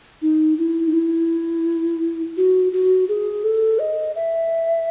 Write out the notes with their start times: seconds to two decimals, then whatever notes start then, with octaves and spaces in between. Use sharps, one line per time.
0.22 D#4
0.58 E4
0.88 D#4
0.93 E4
2.37 F#4
2.73 F#4
3.09 G#4
3.44 A4
3.79 D#5
4.15 E5